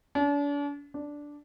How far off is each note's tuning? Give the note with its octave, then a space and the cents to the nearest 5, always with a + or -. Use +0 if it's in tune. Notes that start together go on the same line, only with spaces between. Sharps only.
D4 -40
D4 -5